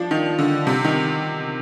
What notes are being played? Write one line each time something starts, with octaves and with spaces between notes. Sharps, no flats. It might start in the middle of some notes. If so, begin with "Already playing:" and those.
Already playing: F3 D4
D#3
D3
C3
D#3